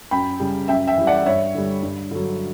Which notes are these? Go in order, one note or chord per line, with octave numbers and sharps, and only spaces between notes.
F#2 G5 B5
C#3 G3
F#2 E5 G5
E5 G5
E3 G3
D5 F#5
G2 C#5 E5
D3 G3
G2
D3 F#3